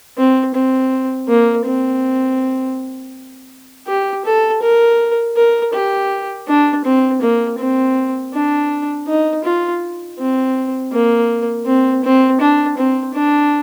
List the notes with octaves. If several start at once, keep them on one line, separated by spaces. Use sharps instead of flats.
C4
C4
A#3
C4
G4
A4
A#4
A#4
G4
D4
C4
A#3
C4
D4
D#4
F4
C4
A#3
C4
C4
D4
C4
D4